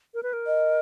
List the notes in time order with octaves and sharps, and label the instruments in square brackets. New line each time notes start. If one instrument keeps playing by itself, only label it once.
[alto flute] A#4
B4
A#4
[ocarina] D#5